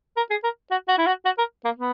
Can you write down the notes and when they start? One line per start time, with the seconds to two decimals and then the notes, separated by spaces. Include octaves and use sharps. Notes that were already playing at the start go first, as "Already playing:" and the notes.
0.17 A#4
0.30 G#4
0.43 A#4
0.71 F#4
0.88 F#4
0.98 E4
1.06 F#4
1.25 F#4
1.38 A#4
1.64 A#3
1.78 B3